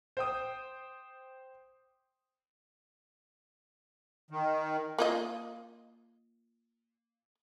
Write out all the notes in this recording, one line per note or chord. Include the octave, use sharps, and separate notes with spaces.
C5 G5 D#6
D#3
A#3 F4 D#5